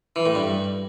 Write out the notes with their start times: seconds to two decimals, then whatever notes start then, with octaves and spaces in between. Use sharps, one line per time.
0.16 E3
0.26 A2
0.35 G2